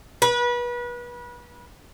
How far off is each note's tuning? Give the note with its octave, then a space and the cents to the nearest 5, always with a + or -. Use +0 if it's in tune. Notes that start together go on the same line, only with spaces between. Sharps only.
B4 -30